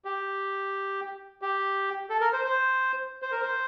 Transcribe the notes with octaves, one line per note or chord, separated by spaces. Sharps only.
G4
G4
A4
A#4
C5
C5
C5
A#4
C5